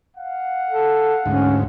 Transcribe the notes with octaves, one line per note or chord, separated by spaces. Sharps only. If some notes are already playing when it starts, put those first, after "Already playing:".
F5 F#5
A4
D2 G#2 C#4